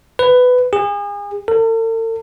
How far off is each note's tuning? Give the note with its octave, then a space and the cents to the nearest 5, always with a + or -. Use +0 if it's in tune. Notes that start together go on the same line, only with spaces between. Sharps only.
B4 +15
G#4 -35
A4 +45